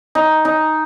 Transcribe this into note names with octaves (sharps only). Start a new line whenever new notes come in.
D#4
D#4